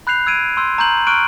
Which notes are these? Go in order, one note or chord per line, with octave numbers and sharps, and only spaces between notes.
B5 F#6 G6 C7 F7
E6 G#6 D7 D#7
C6 E6 G6
A#5 C#6 G6 F#7
C#6 F6 F#6 D7 D#7